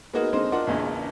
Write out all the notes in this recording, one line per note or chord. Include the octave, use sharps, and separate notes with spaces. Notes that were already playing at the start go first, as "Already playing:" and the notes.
G#3 A#3 B3 D#4 F#4 A#4
D3 G#3 A#3 C4 D#4 C5
D4 F4 A#4 D#5 F#5
A#1 E2 A#2 C#3